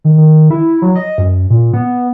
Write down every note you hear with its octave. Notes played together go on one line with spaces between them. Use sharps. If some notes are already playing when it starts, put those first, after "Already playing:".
D#3
D#3
E4
F#3
D#5
F#2
A#2
B3